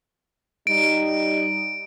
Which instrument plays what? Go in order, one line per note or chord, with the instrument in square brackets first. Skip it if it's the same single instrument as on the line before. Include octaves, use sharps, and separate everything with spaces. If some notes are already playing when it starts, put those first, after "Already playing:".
[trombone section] G3 D#4 [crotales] D7